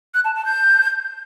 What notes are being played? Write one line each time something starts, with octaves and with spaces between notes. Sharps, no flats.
F#6
A5
A5
G6